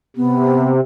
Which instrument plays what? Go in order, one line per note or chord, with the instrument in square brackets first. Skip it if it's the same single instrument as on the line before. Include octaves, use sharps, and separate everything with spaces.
[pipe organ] C3 [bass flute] B3